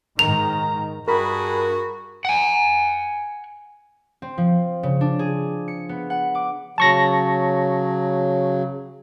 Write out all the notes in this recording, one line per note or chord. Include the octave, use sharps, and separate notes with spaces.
G#2 D#3 A#5 F7
G2 F#4 G#4 A#4 B5
F#5 G#5
C4
F3
C#3
D4
G#4
C#7
B3
F#5
D6
C#3 F#3 A5 C#6 A#6